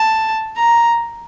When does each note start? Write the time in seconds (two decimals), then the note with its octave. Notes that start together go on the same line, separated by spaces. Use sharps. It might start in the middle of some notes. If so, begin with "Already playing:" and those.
Already playing: A5
0.57 A#5